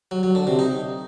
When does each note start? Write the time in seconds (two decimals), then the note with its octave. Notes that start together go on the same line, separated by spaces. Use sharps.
0.11 F#3
0.23 F#3
0.35 D3
0.47 C3
0.59 D#4